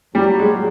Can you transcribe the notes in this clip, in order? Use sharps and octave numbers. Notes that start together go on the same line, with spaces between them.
F#3 G3
G#3
A#2